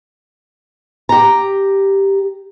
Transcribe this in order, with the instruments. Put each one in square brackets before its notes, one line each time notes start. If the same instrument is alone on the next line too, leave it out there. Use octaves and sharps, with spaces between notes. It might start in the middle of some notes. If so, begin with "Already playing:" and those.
[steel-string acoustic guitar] G4 A#5